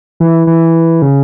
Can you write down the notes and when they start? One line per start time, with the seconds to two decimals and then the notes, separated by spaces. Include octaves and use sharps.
0.20 E3
0.47 E3
1.02 C#3